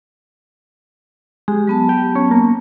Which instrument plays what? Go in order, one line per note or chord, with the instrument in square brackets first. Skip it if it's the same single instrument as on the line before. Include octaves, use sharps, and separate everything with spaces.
[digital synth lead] G#3 [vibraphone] G4
[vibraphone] F#3 B3 A5
[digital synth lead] G4
C#4
A#3